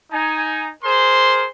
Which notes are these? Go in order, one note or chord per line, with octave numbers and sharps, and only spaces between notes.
D#4 G#5
G#4 A#4 C5 C6